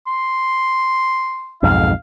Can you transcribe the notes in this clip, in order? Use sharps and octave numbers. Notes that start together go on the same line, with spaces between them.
C6
B1 F2 G#2 F5